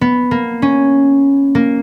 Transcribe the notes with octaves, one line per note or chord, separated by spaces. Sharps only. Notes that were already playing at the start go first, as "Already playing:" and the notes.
B3
A#3
C#4
A#3